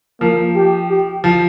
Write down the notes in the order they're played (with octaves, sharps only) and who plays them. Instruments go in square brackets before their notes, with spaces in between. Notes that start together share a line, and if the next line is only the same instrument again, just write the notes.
[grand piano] F3 [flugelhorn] A#3
[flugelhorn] G4
G4
[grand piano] F3